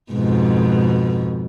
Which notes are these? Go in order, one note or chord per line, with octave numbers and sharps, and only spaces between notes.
F2 G#2 B2